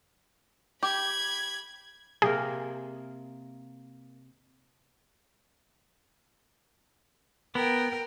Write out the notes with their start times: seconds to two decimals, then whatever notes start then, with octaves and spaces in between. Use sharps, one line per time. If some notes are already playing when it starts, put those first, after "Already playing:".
0.83 G4 B5 G#6
2.22 C3 A#3 G#4 A#4
7.55 B3 A#4 G5